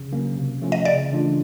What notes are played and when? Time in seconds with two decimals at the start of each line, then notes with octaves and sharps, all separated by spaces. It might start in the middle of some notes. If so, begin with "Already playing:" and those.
Already playing: C#3
0.12 F#3 A#3 C#4
0.37 C3
0.62 F3 A3 C#4 F4
0.72 D#5
0.85 C#3 D5
1.10 E3 A3 D4 F4